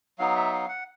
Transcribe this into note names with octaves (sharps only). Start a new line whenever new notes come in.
F#3 B3 D#4 F5
E5
F5
F#5